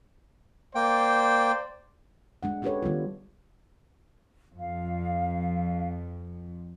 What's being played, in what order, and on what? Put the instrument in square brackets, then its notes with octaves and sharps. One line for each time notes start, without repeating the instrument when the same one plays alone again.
[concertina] A#3 G5 [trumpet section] C5 D5
[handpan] G#3 D4 F#5
C#4 D4 G4 A4 B4 C#5
D#3 G3 B3 F4
[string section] F2 [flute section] F5